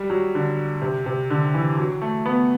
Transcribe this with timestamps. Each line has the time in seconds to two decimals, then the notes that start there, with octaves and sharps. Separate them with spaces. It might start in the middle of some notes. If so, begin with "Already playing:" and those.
Already playing: G3
0.10 F#3
0.35 D3
0.82 C3
1.06 C3
1.30 D3
1.54 E3
1.78 F#3
2.02 A3
2.26 B3